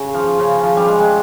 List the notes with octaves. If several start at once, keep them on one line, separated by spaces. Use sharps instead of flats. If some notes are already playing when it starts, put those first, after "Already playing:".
Already playing: C#3
F3
C#3
F3
G3
G#3
G#3